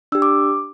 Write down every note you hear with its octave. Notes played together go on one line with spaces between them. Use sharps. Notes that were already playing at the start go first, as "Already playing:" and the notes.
D4 G4 E6
D6